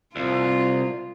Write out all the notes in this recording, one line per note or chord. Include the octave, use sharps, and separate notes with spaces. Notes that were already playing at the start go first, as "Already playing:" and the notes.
C2 F4